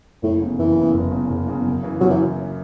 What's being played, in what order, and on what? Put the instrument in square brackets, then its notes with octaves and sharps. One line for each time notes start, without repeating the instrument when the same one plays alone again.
[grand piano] F#1 [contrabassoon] A2
[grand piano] E2 C#3
[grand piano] F#1 [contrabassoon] E3
[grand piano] E2 C#3
F#1
E2 C#3
F#1
E2 C#3
F#2
C#3 E3
[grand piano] F#2 [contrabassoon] F#3
[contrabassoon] E3